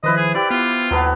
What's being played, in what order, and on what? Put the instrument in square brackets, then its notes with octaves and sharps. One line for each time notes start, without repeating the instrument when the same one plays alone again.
[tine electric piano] D#3 F3 [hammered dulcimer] E4 B4 C5 [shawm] D#5
[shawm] G#4
[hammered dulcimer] E4 G4 G5 [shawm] D5
[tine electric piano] B3 [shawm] F4
[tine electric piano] D#2 [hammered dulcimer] F#3 B3 A4